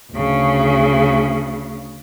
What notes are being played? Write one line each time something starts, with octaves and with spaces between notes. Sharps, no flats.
D2 C#3